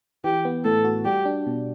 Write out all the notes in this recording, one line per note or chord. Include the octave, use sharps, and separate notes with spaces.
E3 G4
B3
A2 A4
F#4
G3 G4
D4
B2